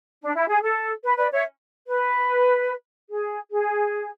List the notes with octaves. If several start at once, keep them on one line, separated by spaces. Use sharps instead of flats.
D4
E4
G#4
A4
B4
B4 D5
C#5 E5
B4
G#4
G#4